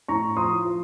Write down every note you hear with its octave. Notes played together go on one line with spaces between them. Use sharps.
A2 A#5 C#6
F3 C6 D#6
F3